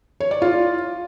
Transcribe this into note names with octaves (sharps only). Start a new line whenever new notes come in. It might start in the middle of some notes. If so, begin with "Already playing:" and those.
C#5
D5
F4